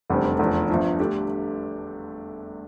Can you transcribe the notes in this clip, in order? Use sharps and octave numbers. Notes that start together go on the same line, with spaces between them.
F1 E2 D3 G3 C4
F1 E2 D3 F3
G1 G2 F3
D3 A3 D4 G4